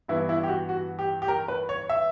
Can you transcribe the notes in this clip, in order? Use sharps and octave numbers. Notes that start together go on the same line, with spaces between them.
G2 E3 B3 E4
E4
G4
F#4
F#4
G4
G4
A#4
B4
C#5
E5